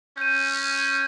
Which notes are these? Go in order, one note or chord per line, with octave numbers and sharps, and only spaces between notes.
C#4 G6 D#7